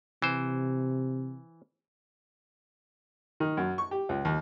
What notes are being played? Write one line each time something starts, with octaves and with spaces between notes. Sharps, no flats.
C3 E3 C5
D#3
F#2
C#6
G4
C#2
D#2